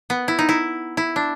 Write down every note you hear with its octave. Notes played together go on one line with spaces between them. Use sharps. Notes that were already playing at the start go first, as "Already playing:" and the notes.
B3
E4
D#4
E4
E4
D4